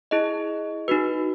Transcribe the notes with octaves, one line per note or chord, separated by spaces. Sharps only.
E4 G#4 D#5
D#4 F#4 B4